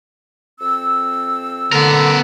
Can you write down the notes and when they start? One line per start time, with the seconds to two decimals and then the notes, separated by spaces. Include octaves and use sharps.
0.60 F2 C4 E6
1.72 D3 B3 A#4